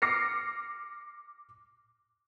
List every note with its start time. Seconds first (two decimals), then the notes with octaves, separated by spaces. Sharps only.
0.02 D6 F6 A#6 C7 C#7